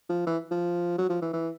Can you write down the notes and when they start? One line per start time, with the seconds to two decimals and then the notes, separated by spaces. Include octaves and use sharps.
0.09 F3
0.26 E3
0.51 F3
0.98 F#3
1.10 F3
1.22 E3
1.33 E3